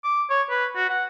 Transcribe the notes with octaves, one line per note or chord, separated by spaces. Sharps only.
D6
C#5
B4
F#4
F#5